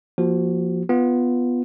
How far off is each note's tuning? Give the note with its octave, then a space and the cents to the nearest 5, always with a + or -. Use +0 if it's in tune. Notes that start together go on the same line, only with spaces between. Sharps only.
F3 +0 A#3 +25 F#4 +25
B3 +0 F4 +0